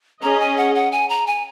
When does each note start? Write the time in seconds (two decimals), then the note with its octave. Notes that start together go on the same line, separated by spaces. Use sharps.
0.22 C#4 G#4 D#5 A#5
0.40 G#5
0.57 F#5
0.75 F#5
0.92 G#5
1.09 A#5
1.27 G#5